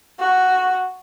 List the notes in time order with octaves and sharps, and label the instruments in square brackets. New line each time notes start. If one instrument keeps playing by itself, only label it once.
[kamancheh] F#4